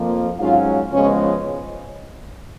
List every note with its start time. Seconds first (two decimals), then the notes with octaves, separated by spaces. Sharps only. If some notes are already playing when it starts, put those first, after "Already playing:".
Already playing: F2 F3 A#3
0.39 G#2 F#3 C#4 F4 F5
0.92 C#2 C#3 F3 G#3 B3 C#4 C#5